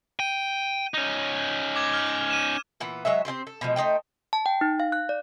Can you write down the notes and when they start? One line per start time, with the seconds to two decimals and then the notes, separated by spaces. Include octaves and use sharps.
0.20 G5 D#7
0.94 C#4 D#4
1.76 D6 G#6
1.94 F6
2.30 D#7 E7
2.80 A#2 E3 B3
3.05 F#3 G#3 C#5 E5
3.25 C4 E4 G4 C5
3.47 A4
3.61 B2 F3 G#3
3.76 A3 D#4 C5 G5
4.33 A5
4.46 G5
4.61 D#4
4.80 F5
4.92 F#6
5.09 D5